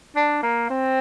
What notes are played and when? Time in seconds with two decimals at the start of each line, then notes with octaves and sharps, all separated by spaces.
0.16 D4
0.43 A#3
0.70 C4